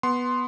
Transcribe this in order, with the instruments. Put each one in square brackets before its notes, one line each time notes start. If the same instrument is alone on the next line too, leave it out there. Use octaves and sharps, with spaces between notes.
[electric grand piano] B3 C6